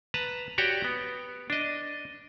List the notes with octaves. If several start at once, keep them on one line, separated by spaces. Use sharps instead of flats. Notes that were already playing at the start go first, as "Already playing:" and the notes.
B4 A5 A#5
F#4 G4 C#5 D5 G5
B3
D4 D#5